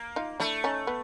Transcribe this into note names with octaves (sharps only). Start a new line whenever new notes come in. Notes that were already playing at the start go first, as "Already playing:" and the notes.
Already playing: A#3
D#4 F4
A3 D4 E4
C#4 D#4
B3